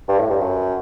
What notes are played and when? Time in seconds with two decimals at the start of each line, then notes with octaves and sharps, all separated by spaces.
0.08 G2
0.19 A2
0.30 G2
0.41 F#2